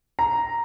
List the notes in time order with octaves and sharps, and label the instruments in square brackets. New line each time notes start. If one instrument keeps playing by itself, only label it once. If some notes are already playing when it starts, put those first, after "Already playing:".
[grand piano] A#5